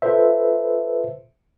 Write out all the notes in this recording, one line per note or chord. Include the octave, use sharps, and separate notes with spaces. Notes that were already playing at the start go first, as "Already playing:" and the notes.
F4 A4 B4 C5 E5